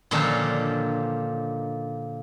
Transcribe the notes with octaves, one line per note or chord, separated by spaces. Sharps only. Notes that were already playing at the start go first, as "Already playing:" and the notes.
A#2 D3 D#3 F3 C#4 D4